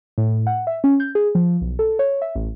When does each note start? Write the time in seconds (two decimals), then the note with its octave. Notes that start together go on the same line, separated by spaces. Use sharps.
0.18 A2
0.47 F#5
0.67 E5
0.84 C#4
1.00 G6
1.15 G#4
1.35 F3
1.61 B1
1.79 A4
1.99 C#5
2.22 E5
2.36 A1